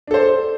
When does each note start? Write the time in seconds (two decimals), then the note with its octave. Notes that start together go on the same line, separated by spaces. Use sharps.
0.07 D4
0.11 A4
0.14 C5